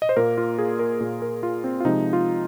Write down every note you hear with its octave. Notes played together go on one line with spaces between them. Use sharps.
D#5
C5
A#2 A#3 A#4
F4
G#4
A#4
A#2 A#3 G#4
A#4
F4
C4
F4
C3 F3 G#3 D#4
F4